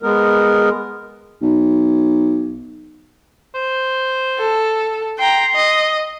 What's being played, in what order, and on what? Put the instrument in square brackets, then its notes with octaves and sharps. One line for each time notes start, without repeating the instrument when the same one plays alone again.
[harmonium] G#3 B3 A#4
[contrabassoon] B1
[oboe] C5
[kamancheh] A4
[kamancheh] G5 A#5 [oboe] C6
[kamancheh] D#5